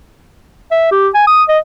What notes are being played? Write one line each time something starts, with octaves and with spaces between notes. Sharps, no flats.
E5
G4
G#5
D#6
D#5